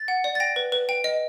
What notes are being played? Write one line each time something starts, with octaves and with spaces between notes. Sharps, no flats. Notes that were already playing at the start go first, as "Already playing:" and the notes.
Already playing: A6
F#5
D5
A6
G5 A#6
B4
B4
G5
D#5